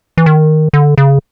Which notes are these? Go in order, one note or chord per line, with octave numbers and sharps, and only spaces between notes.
E3
D#3
D3
C#3